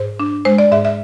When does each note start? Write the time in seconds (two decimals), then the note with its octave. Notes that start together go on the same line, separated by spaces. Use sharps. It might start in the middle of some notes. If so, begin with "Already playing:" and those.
Already playing: G#2 C5
0.20 D4
0.45 G#3 C5
0.58 D5
0.72 G#2 E5
0.85 E5